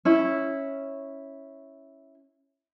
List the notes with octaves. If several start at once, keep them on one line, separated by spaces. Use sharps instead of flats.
C#4 E4